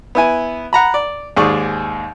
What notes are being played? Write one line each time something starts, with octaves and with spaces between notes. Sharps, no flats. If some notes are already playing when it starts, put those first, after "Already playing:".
B3 E4 G#5
F#5 A#5 B5
D5
D#2 G#2 G#4 D5 C#6